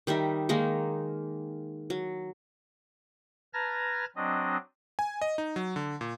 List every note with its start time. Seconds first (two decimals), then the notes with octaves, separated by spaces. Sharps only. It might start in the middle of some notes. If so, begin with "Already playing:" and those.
0.07 D#3 G3 D#4 E5
0.49 D#3 G#3 A#3 D#4
1.90 F#3
3.54 B4 A5 A#5 F6 G#6 A#6
4.16 F#3 C4 D4 D#5
4.99 G#5
5.22 D#5
5.38 D#4
5.56 F#3
5.76 D3
6.01 A#2